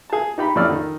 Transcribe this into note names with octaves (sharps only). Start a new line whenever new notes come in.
G#4 A5
D#4 G4 B5
F2 A2 C#4 D5 E6 F6
D#3